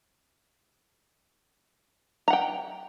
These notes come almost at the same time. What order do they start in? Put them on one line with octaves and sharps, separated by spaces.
A#5 F#5 G5